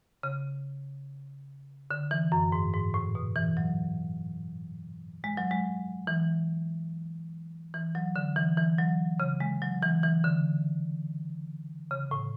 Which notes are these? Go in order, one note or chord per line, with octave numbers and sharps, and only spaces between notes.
C#3
D3
E3
F#2
G#2
G#2
A2
B2
E3
F#3
G#3
F#3
G#3
E3
E3
F#3
D3
E3
E3
F#3
C#3
G#3
F#3
E3
E3
D3
C#3
A2